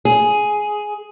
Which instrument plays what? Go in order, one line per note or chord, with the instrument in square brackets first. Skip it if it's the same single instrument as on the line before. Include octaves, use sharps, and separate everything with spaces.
[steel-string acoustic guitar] G#4